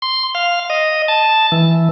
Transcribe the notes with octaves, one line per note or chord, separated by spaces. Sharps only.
C6
F5
D#5
A5
E3